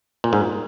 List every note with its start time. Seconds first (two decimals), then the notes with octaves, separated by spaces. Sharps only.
0.24 A#2
0.33 G#2